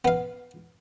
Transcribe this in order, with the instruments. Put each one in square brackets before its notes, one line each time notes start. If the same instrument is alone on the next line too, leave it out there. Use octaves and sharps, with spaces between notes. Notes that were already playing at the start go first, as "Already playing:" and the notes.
[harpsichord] B3 F5